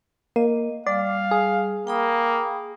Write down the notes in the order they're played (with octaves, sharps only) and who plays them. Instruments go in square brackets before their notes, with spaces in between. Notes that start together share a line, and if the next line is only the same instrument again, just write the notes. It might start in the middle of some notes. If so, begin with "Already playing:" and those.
[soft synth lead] A#3 [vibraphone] D#5
[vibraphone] G3 [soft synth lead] D5 [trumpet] F5
[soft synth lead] G#4
[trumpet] A#3 [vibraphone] G5 B5 D#6